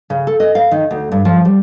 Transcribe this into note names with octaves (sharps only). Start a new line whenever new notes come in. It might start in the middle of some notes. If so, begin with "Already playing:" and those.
C#3
A4
D#5
F5
D#3
D2
G2
F3
G3